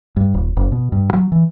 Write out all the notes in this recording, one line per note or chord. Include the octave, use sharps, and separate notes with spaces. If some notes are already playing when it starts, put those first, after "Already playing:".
G2
D#1
F#1
B2
G2
F#3
E3